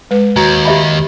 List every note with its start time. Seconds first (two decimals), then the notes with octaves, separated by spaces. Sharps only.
0.11 G#3 B4
0.36 D#2 F#4 A#5
0.65 G4 E5 B5